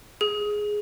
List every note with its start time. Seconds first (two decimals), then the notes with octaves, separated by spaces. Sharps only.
0.21 G#4